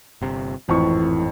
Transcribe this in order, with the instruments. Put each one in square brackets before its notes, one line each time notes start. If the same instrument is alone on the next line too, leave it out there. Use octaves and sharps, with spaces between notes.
[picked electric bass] G1 C3
[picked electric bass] G#1 A2 [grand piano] F2 C#6 [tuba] E3